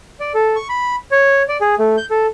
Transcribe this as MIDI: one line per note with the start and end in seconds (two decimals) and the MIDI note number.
0.20 0.32 74
0.34 0.56 69
0.56 0.68 85
0.69 0.96 83
1.11 1.43 73
1.48 1.57 74
1.61 1.75 68
1.79 1.96 57
1.97 2.05 91
2.10 2.26 69